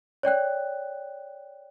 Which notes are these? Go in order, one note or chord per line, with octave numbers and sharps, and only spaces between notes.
C#5 D5 G5 F#6